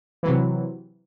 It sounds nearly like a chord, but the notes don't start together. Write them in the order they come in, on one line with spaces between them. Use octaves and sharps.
E3 F#3 C3